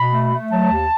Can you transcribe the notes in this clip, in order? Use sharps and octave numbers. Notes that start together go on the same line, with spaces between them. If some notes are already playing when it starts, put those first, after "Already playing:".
Already playing: B2 B5
A3
A3
F#3 A5
D#2